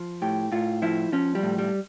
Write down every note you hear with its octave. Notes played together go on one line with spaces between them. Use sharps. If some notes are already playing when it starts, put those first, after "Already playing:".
Already playing: F3
A2 G4
A2 F4
F3 E4
F3 C#4
G3
A2
G3